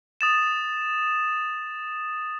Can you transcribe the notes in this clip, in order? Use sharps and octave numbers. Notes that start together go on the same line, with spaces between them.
D#6 A6 E7